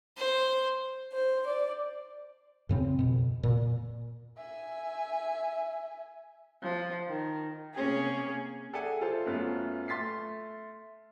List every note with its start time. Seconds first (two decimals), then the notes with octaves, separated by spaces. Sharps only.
0.17 C5
1.12 C5
1.46 D5
2.69 F#2 C#3 C4
2.99 F2 B2
3.43 A#2
4.37 E5 G#5
6.62 F3
7.09 D#3
7.74 C3 A#3 C#4 G#4
8.73 G#4 A4 D5 E5 F#5 G#5
9.01 F4 A4 C5
9.26 F#2 A3 B3 F4
9.88 A3 C6 A6 B6 C7